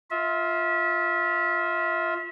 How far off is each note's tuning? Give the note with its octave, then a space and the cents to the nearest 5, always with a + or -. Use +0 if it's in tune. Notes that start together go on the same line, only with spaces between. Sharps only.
F4 +0 E5 -30